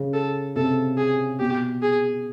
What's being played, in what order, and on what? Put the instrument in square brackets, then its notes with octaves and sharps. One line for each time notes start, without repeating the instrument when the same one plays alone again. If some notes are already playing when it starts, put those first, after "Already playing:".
Already playing: [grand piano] C#3
[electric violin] A4
[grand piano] C3 [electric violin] A4
[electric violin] G#4
[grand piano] B2 [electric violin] G4
[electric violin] G#4